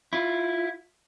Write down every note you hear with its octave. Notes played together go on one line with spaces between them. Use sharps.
E4 F4